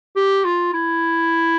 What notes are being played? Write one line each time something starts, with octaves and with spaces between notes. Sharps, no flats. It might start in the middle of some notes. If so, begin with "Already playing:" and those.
G4
F4
E4